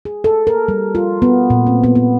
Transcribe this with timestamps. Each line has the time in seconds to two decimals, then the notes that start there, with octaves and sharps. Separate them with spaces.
0.05 G#4
0.24 A4
0.47 A#4
0.68 G3
0.95 F4
1.22 B3
1.50 A#2
1.67 C4
1.84 B3
1.95 B3